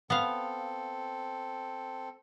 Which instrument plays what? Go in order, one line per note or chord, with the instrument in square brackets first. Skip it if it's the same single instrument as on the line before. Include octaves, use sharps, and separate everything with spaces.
[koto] B3 F5 [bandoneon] C4 A4